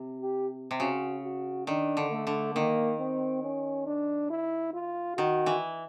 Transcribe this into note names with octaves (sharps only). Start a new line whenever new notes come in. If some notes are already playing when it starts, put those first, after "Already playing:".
Already playing: C3
G4
C3
C#3 F#4
F#4
D#3 D4
D3
A3
D3
D#3 A#3
C4
C#4
D4
E4
F4
D#3 F#4
E3